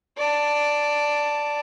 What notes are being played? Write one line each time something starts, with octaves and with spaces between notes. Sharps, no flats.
D5 A5